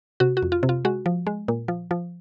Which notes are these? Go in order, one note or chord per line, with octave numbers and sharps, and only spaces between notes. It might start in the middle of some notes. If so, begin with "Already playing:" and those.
C3 F#4
F#4
F2
F4
C3
F4
G#3 F#4
F3
G#3
A#2
F3
F3